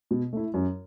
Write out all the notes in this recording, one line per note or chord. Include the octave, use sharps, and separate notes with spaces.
B2
A3 E4
F#2